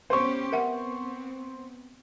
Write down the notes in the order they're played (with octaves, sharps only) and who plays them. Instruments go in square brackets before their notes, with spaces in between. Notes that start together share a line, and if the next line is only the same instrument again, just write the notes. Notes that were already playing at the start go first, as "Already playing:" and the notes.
[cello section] B3 C#4 G4 [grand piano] C5 C#6
[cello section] B3 C4 [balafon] A#4 E5 F#5